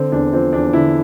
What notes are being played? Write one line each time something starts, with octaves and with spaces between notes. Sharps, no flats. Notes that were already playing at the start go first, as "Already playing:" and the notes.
Already playing: D3 C4
E2 D4
F3 C4
E2 D4
D3 E4